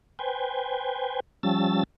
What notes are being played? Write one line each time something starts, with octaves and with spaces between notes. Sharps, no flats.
B4 C5 G5 G#5
F3 G3 C#4 A5 E6 A6